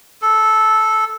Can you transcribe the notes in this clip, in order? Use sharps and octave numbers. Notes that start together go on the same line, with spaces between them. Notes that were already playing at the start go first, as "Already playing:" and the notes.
A4